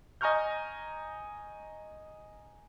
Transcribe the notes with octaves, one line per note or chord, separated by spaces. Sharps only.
D#5 G#5 A#5 C#6 F6 G6